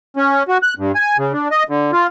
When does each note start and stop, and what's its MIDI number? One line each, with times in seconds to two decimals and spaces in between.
0.17 0.43 61
0.48 0.58 66
0.63 0.74 90
0.78 0.92 43
0.95 1.17 80
1.18 1.33 49
1.33 1.48 62
1.51 1.63 75
1.69 1.91 50
1.92 2.07 65